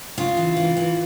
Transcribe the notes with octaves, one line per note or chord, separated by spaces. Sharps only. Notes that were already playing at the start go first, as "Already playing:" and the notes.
C#3 F4
E3
E3
E3